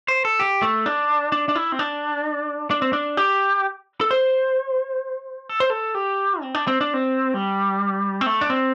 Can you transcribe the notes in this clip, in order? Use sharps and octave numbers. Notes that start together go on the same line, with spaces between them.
C5
A4
G4
A3
D4
D4
D4
E4
C4
D4
D4
C4
D4
G4
A4
C5
A4
C5
A4
G4
C4
D4
C4
D4
C4
G3
C4
A3
D4
C4